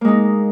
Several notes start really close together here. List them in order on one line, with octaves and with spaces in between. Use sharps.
A#3 G#3 D#4